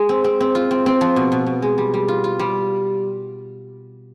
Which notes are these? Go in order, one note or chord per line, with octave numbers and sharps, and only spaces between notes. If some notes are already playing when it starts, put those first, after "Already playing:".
Already playing: G#3
C4
C4
C4
F4
C4
C4
F3
B2
B2
B2
G#3
G3
G3
F4
F4
G3